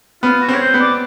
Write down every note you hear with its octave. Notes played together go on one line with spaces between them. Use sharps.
B3 F4
F#4
C4
C#5
C5
B3
D5